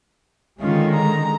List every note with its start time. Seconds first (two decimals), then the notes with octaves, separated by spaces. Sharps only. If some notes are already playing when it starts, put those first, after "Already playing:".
0.61 D3 D#3 G#3 C#4 F4
0.94 A#5